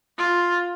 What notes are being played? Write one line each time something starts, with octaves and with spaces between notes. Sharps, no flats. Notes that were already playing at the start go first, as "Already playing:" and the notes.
F4